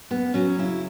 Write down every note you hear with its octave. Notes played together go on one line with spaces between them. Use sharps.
F#2 B3
F#3 C#4
C#3 E4